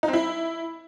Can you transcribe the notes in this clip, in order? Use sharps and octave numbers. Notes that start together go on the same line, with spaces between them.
D#4
C4
E4